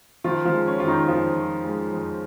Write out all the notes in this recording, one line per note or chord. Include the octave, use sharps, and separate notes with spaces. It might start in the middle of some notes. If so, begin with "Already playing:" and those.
D#3 F3 F4
F3 F4
G#3
C#4
F2 F4
D#3 D#4
F2 F3 F4
D#3
G#3
F2